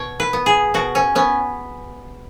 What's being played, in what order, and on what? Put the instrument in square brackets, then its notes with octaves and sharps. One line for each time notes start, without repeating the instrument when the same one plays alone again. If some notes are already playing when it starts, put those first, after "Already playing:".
Already playing: [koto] B2 C#5
B4
B3
G#4
B2 F#4
C#4
B3 C#4